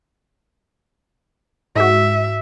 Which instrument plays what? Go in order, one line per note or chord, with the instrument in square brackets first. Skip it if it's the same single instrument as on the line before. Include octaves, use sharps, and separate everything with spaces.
[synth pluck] G#2 F#4 [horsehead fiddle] E5